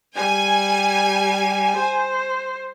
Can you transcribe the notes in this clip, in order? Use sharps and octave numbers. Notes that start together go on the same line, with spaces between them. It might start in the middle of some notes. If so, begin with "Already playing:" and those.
G3 G#5
C5